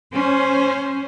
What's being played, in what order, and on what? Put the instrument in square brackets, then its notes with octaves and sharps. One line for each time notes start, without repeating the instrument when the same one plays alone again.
[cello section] C#4 C5